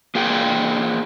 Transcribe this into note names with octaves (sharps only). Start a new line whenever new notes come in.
A#3 F4 G#4 G5